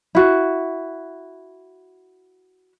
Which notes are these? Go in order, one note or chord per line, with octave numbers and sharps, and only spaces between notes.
E4 F#4